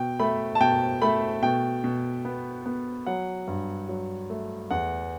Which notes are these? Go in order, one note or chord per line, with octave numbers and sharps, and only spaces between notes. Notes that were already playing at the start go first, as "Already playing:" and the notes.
Already playing: B2 G5
A3 B5
A5
B2 G5
A3 B5
B2 G5
B2
B3
B3
F#3 F#5
G2
F#3
A3
E2 F#5